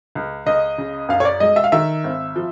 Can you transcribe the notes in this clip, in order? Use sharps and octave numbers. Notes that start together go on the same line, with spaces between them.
C#2
C#2 D#5
C#3
F#2 F5
C#5
D5
G#3 D#5
E5
F5
D#3 E5
G#1
F3